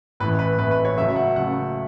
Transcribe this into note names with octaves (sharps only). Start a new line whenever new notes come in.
A1 A2 E3 A3 B4
B4
A1 A2 E3 A3 B4
B4
C#5
C#2 C#3 F#3 A3 E5
E5
F#5
C#2 C#3 F#3 A3 F#5